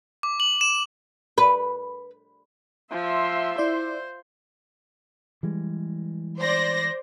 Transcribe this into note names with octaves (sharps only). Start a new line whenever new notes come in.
D6
F#7
E7
B4
F3 E5 C6
E4 C5 D5
E3 G3 G#3
C5 D5 A#6